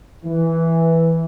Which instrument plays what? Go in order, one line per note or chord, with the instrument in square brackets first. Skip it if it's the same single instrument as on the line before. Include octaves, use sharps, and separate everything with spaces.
[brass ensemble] E3